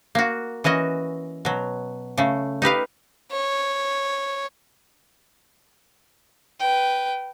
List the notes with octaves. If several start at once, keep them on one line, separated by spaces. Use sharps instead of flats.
A#3 F#4
E3 C#4 F#4 D#5
B2 F#3
C#3 A3
D#4 G4 B4 F5
C#5
B4 G5